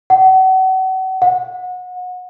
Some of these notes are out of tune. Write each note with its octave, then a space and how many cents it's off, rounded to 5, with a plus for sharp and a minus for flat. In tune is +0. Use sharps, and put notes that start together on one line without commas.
F#5 +35
F#5 -30